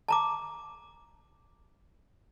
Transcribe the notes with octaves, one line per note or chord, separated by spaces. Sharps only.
A5 A#5 D6